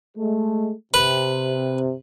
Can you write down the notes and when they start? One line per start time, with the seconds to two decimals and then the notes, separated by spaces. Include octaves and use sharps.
0.18 G#3 A3
0.94 C3 B4